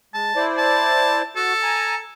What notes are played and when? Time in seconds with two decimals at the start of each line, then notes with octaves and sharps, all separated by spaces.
0.14 G#3 A5
0.36 E4 C5 D5
0.58 A5
1.36 F#4 A4
1.62 G#5 A#5